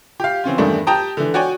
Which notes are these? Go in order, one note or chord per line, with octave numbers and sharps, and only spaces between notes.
G4 F5
E3 C4 C#4 F4
E2 G2 D#3 A3 D4
G4 G5 A5 A#5 D#6
D3 E3
F#4 C#5 D5 G5 G#5